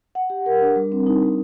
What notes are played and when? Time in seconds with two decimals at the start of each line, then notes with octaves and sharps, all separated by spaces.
0.15 F#5
0.30 G4
0.46 A#4
0.62 D4
0.76 G3
0.92 C4
1.06 D#4
1.22 G3